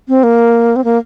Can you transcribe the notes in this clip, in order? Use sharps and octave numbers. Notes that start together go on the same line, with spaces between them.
C4
A#3
C4
A#3